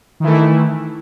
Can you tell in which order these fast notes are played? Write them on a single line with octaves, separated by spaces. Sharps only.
D#3 E3 A3 E4